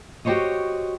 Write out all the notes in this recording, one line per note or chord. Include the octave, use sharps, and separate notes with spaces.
F#4 G4 A4 C5 C#5 D#5